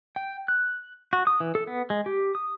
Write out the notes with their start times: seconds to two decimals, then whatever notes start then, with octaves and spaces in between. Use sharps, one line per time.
0.16 G5
0.48 F#6
1.13 F#4
1.27 D#6
1.40 E3
1.55 A4
1.67 B3
1.90 G#3
2.06 G4
2.35 D#6